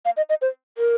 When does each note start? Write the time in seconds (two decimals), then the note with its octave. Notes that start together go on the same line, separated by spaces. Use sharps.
0.05 F5
0.17 D#5
0.29 D#5
0.42 C5
0.78 A#4